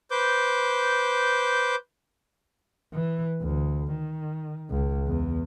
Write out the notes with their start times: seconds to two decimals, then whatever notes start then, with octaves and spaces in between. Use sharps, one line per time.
0.11 B4 C5 D6 G6
2.93 E3
3.42 D2
3.92 D#3
4.71 C#2
5.07 E2